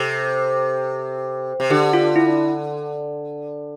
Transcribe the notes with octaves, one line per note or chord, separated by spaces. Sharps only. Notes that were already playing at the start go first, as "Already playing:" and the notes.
Already playing: C3 A4
C3
D3 G4
F4
E4